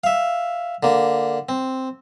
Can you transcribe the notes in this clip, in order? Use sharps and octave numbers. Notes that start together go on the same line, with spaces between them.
E5 F5
D3 A#3
C4